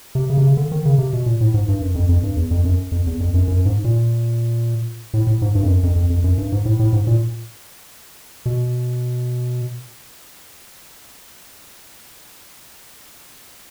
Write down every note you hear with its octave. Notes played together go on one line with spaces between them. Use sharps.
C3
C#3
C3
C#3
D3
D#3
C#3
C3
B2
A#2
A2
G#2
G2
F#2
F2
F2
G2
E2
F2
F#2
F2
E2
F2
F#2
F#2
G#2
A#2
A2
A2
G#2
G2
F2
F#2
F2
F2
F2
F#2
G2
G#2
A2
A2
G#2
A#2
B2